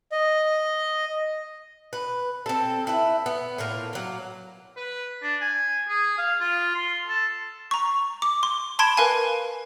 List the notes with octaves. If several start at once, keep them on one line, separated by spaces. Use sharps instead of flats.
D#5
B4
C4 A4
E4 B4
B3
A2 A#3 F4 A#4
F#3 A#3
B4
D4
G#5
G#4
F5
F4
C6
A4
A#5 C#6
D6
C6
A5 B5 C6 G#6 D7 E7
A#4 B4 F5 G#5